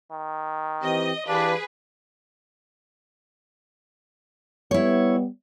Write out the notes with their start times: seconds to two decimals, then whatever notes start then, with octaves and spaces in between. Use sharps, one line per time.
0.11 D#3
0.83 E3 C4 G4 D#5
1.28 E3 D4 G4 G#4 B4 F5
4.71 G3 B3 E4 C#5